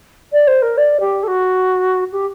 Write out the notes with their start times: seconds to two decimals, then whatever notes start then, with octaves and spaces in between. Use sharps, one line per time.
0.32 D5
0.47 C5
0.62 A#4
0.77 D5
1.00 G4
1.23 A4
1.27 F#4
2.12 G4